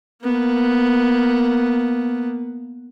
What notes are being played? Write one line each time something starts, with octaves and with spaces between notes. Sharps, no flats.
A#3 B3